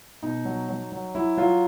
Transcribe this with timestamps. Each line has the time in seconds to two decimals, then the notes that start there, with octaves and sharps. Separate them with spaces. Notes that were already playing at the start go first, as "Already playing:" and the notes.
0.23 B2 D#4
0.45 F#3
0.69 F#3
0.92 F#3
1.15 F#3 E4
1.37 F#3 F4